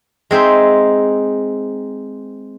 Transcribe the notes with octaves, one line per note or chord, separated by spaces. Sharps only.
G#3 C4 D#4 E5